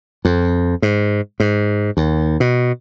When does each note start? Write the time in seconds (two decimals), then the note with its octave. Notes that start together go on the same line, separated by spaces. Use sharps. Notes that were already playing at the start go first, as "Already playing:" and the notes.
0.25 F2
0.82 G#2
1.40 G#2
1.97 D#2
2.40 B2